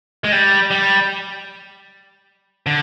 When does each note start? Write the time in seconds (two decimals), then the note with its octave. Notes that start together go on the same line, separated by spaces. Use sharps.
0.24 G#3
0.32 G3
0.71 G3
2.66 D3